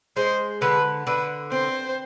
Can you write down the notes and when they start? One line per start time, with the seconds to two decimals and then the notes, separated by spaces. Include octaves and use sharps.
0.17 G#3 C5
0.61 D3 B4
1.07 D3 B4
1.52 C4 C5